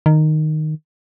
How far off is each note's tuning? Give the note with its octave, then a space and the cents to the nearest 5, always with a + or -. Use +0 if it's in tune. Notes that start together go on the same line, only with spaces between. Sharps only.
D#3 -10